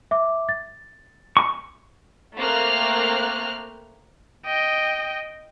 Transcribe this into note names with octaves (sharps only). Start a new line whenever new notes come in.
E5 D6
A6
C#6
A3 A#3 C4 F6 F#6
D#5 G5